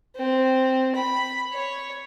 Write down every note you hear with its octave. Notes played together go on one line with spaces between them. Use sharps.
C4
B5
C#5